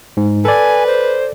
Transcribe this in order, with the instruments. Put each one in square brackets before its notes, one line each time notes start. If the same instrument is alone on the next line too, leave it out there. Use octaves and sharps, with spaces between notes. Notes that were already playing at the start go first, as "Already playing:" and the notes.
[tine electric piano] G#2
[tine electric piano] A4 D5 [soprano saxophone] B4 [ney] G#5
[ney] C5